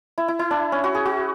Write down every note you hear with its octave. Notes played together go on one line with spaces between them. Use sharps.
E4
E4
E4
D4
C#4
F#4
G#4
F#4